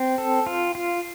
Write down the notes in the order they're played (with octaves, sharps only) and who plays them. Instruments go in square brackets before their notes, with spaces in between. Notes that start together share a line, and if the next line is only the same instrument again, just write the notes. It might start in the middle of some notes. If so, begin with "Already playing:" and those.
Already playing: [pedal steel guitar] C4
A4
F4
F4